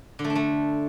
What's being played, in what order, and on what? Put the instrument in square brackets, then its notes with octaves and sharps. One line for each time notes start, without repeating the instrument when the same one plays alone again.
[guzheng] D3
A3
D4
A3